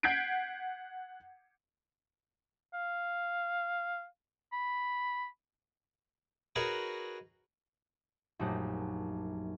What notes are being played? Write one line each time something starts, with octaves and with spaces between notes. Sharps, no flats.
F#5 G6 G#6 B6 C7 D7
F5
B5
D#4 F#4 G#4 A#4 B4 C#5
A#1 F#2 A3 D#4 G4 F#5